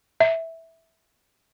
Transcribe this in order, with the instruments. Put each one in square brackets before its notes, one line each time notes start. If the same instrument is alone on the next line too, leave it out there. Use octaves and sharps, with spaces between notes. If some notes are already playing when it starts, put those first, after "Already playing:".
[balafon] E5